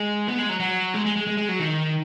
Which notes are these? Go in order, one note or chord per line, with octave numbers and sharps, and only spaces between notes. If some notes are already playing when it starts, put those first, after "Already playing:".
Already playing: G#3
B3
G#3
F#3
F#3
G#3
G#3
G#3
G#3
G#3
F#3
D#3